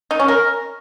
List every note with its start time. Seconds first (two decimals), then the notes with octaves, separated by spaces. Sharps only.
0.11 D#4
0.19 C#4
0.28 A#4